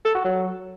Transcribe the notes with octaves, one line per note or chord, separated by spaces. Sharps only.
A4
F#4
F#3